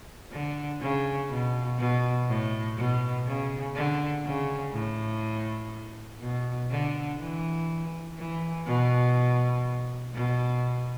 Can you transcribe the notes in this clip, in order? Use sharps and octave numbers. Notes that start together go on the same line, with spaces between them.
D3
C#3
B2
B2
A2
B2
C#3
D3
C#3
A2
B2
D3
E3
E3
B2
B2